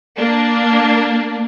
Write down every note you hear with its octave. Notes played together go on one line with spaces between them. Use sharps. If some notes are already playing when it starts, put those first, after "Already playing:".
A#3 D4